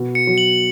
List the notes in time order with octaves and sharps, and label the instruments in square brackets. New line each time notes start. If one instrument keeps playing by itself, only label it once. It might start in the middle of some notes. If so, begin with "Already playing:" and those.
Already playing: [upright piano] B2
[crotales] C#7
[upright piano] F#3
[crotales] F#7